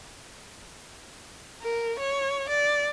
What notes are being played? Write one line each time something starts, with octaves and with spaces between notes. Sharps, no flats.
A#4
C#5
D5